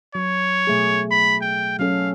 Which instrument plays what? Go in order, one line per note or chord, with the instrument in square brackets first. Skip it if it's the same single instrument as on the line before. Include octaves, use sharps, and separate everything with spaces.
[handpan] F#3 [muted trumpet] C#5
[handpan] B2 A3 G#4
[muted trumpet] B5
G5
[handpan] F#3 C#4 A4 [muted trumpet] F5